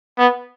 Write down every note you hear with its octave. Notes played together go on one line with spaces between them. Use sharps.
B3